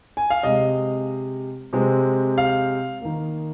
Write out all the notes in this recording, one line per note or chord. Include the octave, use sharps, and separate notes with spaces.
G#5
F5
C3 G#3 C4 D#5
C3 G#3 C4
F5
D#3 A#3